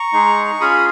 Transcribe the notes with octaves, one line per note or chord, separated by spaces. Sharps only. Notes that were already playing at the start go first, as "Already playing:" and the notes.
Already playing: A#5 C#6
G#3 D#4 G#4
C#4 F4 G#4 B5 D#6